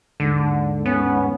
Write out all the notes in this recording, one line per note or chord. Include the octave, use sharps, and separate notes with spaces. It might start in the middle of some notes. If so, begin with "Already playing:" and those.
D#2 G#2 D3
B3 C#4